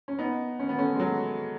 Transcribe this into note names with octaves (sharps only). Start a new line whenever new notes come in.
C#4
B3 D#4
C#4
B3
A3 C#4
G#3
F#3